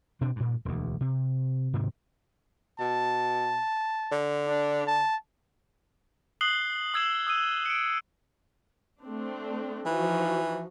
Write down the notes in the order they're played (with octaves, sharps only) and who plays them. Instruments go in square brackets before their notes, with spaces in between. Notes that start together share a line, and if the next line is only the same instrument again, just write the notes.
[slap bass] B2 C4 D4
G2 A#2
E1 D2
C3
G#2 C3 D#3
[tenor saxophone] B2 [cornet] A5
[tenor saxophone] D3
[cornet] D4
A5
[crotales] D#6 F#6 C7 F#7 G7
D#6 E6 G#6 C7 E7 F#7
D#6 E6 D#7
C#7 D7
[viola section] A3 C4 D4
[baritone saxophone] E3 [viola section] F3 D#4 F#4